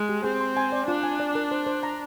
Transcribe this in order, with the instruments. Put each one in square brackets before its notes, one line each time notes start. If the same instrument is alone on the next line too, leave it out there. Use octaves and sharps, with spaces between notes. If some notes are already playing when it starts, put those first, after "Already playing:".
Already playing: [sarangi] G#3
[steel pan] G4
[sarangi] C4 [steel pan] G#4
[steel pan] C6
G#5
D5
[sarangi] D4 [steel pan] F4
[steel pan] G#5
D5
A#4
C5
C5
A#5